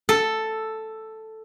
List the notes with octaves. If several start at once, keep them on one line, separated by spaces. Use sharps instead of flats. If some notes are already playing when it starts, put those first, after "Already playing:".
A4